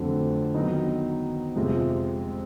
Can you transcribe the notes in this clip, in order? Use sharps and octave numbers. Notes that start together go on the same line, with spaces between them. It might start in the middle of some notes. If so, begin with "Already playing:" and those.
Already playing: F2 D3 F#3 A3 C4
D#3 F#3 B3 D#4
F2 C3 F3 G#3